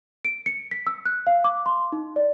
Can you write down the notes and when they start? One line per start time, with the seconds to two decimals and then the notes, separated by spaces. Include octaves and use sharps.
0.25 D7
0.46 C#7
0.71 B6
0.87 E6
1.05 F#6
1.27 F5
1.44 D6
1.66 C6
1.92 D#4
2.16 D5